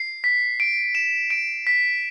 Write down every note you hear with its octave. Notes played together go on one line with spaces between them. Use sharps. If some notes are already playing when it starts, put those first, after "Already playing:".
Already playing: C7
B6
D7
E7
D7
B6